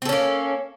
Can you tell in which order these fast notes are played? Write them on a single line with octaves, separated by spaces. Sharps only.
C4 A4 C#4 A#3